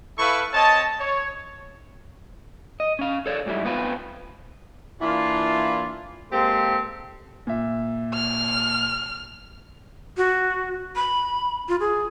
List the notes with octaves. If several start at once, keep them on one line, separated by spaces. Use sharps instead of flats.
E4 A4 B4 F5 C#6
C4 C#5 D#5 A5
C#5
D#5
C#4 F5
A4 C#5 D5
G#2 F#3 G3 A3 E4
B3 C4 F4 B4
E3 A#3 D4 E4 F4
G#3 A#3 C4 G4 A4 C5
A#2 E5
F6
F#4
B5
F4
G#4